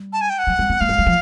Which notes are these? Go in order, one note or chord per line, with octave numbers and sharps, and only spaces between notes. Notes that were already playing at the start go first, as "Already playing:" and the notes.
Already playing: G3
A5
G#5
G5
F#5
F#3
G3
A#3
A3 F5
G#3
F#3
F3